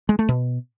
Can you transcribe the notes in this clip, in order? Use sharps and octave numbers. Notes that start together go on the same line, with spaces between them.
G#3
A3
B2